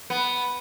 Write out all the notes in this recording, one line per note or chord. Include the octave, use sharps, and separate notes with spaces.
B3